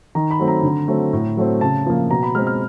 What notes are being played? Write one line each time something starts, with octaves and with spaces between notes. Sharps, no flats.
D#3 A#5
B5
F#3 A3 C4
A#5
D3
F#3 A3 C4
A2
F#3 A3 C4
C#3 A5
F3 A#3
B2 A#5
B5
G#3 C4 F6
F6